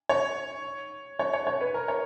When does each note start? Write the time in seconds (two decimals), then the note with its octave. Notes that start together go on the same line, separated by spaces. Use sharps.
0.09 C#5
1.19 C#5
1.34 C#5
1.47 C#5
1.61 B4
1.74 A#4
1.88 C#5